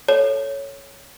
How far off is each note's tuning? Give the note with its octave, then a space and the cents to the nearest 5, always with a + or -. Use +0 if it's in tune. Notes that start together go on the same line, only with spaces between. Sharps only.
A4 -5 C#5 +0